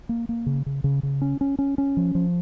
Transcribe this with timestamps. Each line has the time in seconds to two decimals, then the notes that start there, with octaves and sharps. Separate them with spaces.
0.09 A#3
0.29 A#3
0.46 C#3
0.66 C#3
0.84 C#3
1.03 C#3
1.22 C#4
1.41 C#4
1.59 C#4
1.78 C#4
1.97 F3
2.15 F3